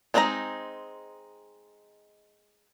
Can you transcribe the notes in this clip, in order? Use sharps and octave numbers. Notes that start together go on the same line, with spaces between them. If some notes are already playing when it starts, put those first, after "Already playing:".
G#3 C4 D4 D#4 A#5